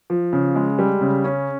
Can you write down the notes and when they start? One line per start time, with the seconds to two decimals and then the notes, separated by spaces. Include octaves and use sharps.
0.10 F3
0.33 C#3
0.56 G#3
0.79 G3
1.01 C#3
1.24 C#4